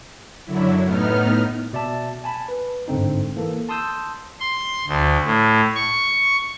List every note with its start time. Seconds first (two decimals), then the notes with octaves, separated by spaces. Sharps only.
0.45 F#2 D3 F#3 E4
0.85 A2 B3 D#4 F6
1.73 B2 D5 E5 A5
2.24 G#5 A5 B5
2.48 B4
2.88 G1 G#2 D3 C4 D#4
3.36 E3 A#3 A4
3.69 A5 C6 D#6 E6 G6
4.40 C6
4.87 D2
5.25 A2
5.75 C#6